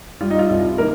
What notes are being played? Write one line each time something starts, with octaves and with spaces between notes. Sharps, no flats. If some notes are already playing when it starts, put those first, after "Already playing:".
G3 F4
D#4
F4
C2 F4
D#3 A#3 A#4